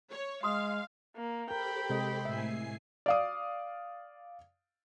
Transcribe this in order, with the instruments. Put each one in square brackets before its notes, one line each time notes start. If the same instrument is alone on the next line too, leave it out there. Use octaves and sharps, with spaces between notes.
[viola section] C#5
[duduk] G#3 [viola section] F5 [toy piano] C6 D#6
[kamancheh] A#3
[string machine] G4 A4 C5 [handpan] A#4 [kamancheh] G5 B5
[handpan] C3 G#3 D#5
[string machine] A2 G#5 C7 [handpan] E5
[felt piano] D5 F5 D#6